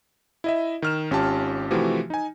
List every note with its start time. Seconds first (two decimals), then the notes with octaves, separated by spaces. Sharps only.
0.44 E4 D#5 E5
0.82 D#3 F6 E7
1.11 G#1 C#4 F4 G4 A5
1.71 C3 E3 F3 A3 F#4 G4
2.10 D#4 G#5